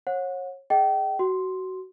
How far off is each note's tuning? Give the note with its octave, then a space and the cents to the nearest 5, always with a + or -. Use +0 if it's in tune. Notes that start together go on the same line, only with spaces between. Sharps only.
C#5 -30 F#5 -30
G#4 +10 D#5 +10 G5 -35
F#4 +20 C6 +0